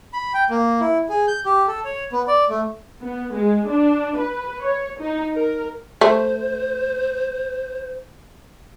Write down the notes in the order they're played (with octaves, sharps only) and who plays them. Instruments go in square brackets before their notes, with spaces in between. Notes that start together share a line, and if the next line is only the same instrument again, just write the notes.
[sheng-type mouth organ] B5
G5
A#3
E4
G#4
G6
G4
A4
C#5
B3
D5
A3
[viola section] B3
G#3
D4
B4
C#5
D#4
A#4
[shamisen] A3 [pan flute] C5